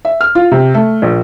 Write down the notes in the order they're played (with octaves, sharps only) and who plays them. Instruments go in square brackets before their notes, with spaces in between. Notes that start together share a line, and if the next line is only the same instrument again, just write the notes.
[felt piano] E5
F6
F4
C3
A3
A#1